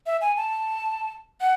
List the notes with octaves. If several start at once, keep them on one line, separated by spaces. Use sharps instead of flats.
E5
G#5
A5
F#5